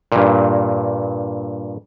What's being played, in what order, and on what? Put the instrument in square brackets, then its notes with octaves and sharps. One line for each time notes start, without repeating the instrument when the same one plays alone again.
[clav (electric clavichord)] G2 A#2